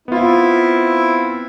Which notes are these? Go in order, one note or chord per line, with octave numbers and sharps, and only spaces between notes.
B3 C4 E4 F4